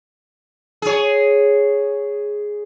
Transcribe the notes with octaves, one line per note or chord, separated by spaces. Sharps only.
G#4 C#5